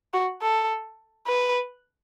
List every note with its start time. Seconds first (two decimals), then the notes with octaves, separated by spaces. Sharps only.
0.14 F#4
0.42 A4
1.27 B4